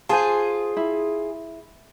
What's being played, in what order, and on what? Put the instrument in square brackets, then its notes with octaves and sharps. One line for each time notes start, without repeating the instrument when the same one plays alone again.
[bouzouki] F4 G#4 [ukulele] C5 G#5 A5
[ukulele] E4